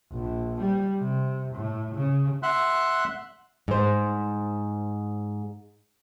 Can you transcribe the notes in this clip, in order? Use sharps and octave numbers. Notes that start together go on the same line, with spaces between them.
A#1
G3
C3
A2
C#3
E5 F#5 C6 F#6
G#2 C5